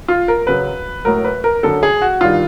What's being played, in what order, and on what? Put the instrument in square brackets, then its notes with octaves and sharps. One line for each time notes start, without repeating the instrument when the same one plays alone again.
[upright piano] F4
A#4
F#2 C#3 F#3 B4
A2 F#3 A#4
B4
A#4
F#2 D3 F#3 A4
G#4
F#4
G2 D#3 G3 F4